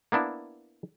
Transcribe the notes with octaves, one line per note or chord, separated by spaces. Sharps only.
A#3 B3 D4 E4